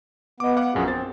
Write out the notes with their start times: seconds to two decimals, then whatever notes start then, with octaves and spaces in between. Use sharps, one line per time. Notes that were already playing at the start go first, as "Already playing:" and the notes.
0.40 B3 D#5 D6
0.56 F5 F#5 D6
0.75 A#1 F#2 F4 F#4 G#4
0.88 C4 C5 A6